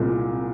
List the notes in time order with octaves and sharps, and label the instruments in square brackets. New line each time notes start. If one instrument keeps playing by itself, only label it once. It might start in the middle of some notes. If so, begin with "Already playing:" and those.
Already playing: [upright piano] C2 A#2 G#3